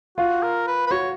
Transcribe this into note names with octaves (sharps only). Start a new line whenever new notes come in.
F4 F#4
A#4
B4
B4
F#4 C#5